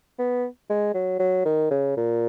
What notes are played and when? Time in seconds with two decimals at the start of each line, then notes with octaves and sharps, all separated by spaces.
0.19 B3
0.70 G#3
0.94 F#3
1.20 F#3
1.45 D#3
1.71 C#3
1.97 A#2